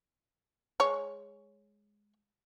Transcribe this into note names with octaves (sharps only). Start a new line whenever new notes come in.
G#3 C#5